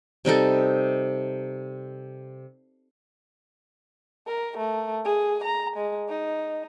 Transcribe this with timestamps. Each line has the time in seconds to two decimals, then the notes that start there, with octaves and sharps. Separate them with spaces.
0.25 C3 G3 D#4 A4
4.27 A#4
4.58 A3
5.04 G#4
5.44 A#5
5.76 G#3
6.09 D#4